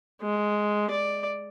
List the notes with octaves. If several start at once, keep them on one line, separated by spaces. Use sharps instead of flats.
G#3
D5